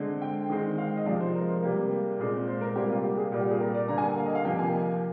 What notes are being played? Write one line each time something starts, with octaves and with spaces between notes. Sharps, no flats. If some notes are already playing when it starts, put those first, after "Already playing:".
Already playing: D3 G#3 C4
G5
D#3 G#3 C4
F5
G5
D#5
C3 F3 G#3 C4 D5
C5
A#4
C3 G3 A#3
A#2 G#3 C4
C5
A#4
C3 G3 A#3 G4
F4
G4
G#4
A#2 G3 A#3 F4
G4
G#4
A#4
D5
D3 G3 A#3 A#5
G#5
G5
F5
D#5
F5
C3 F3 A#3 G5
G#5